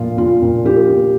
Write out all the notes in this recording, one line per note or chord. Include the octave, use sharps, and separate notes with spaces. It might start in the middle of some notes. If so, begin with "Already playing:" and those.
Already playing: A#2 F3 F4
A#2 F4
A#2
F3 G4
A#2